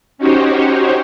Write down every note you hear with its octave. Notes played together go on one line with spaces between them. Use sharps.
C#4 D#4 F#4 G4 C5 C#5